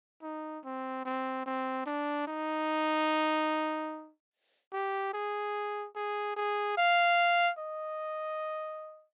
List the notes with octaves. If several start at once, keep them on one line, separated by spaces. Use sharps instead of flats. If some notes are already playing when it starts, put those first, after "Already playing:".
D#4
C4
C4
C4
D4
D#4
G4
G#4
G#4
G#4
F5
D#5